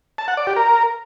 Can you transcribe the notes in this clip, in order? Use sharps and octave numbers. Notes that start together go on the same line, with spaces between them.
A5
F#5
D5
G4
A#4